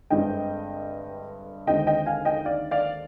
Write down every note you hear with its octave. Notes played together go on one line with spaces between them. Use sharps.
G1 G2 D3 G#3 C4 D#5 G5
D#2 D3 G#3 C4 D#5 G5
D#5 G5
F5 G#5
D#5 G5
D5 F5
D5 F5